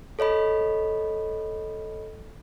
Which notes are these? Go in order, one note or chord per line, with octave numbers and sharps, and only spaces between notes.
A4 C#5 D#5 B5